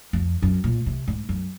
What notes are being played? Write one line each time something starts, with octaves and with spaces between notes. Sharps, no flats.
F2
F#2
A#2
C3
G#2
F#2